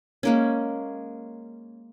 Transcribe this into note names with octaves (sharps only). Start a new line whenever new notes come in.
G#3 A#3 C#4